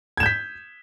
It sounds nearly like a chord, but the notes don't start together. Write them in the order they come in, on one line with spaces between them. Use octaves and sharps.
G#6 E7 G6 B6